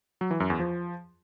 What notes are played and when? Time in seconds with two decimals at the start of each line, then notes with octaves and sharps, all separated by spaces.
0.21 F#3
0.31 E3
0.40 F#2
0.50 E2
0.59 F3